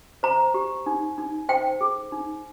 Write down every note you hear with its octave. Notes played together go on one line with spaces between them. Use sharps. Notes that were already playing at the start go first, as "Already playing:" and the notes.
C5 A#5
G4
D#4
D#4
C5 G5
G#4
D#4